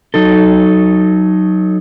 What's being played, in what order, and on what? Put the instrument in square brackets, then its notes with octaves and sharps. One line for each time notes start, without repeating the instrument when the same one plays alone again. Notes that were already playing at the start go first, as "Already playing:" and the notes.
[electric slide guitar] F#3 D#4 A4